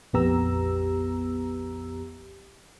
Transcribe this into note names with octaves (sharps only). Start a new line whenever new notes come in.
A#1 F2 B3 G4 A#5 E6